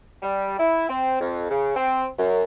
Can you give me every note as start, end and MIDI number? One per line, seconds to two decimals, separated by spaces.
0.23 0.59 55
0.60 0.89 64
0.89 1.18 60
1.21 1.47 41
1.51 1.75 49
1.77 2.06 60
2.18 2.42 42